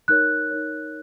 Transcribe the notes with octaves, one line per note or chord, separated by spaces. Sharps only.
D#4 A#4 C#5 F#6
D#4 A#4 C#5